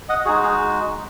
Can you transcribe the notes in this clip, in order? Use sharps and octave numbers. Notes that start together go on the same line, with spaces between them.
D#5 F#5
G#3 D#4 F#4 G#4
G#4